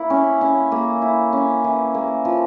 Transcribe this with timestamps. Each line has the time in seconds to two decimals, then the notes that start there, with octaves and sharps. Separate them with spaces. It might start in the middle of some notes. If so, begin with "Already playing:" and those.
Already playing: A#3 E4
0.10 C#4
0.41 C#4
0.72 A#3
1.02 E4
1.33 C#4
1.64 E3
1.94 A#3
2.25 F3